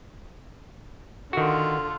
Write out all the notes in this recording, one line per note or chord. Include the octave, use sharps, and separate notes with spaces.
D3 D#3 F4 F#4